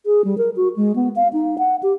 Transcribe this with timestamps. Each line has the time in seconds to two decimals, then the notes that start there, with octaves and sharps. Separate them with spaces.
0.06 G#4
0.25 G3
0.38 A#4
0.56 F#4
0.76 G#3
0.96 B3
1.16 F5
1.33 D#4
1.58 F#5
1.83 G4